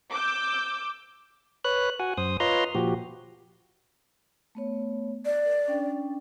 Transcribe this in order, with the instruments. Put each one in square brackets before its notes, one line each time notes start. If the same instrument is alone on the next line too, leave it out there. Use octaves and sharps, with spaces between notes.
[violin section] D6 E6 G6
[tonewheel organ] B4 C#5 F#6
F#4 F#5 G#5
F#2 C5 D#6
F4 B4 C#5 D#5 A#5 C6
A#2 F3 F#4 G4
[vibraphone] A3 B3 C#5
[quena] D5
[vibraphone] A#4
C#4 D4 G5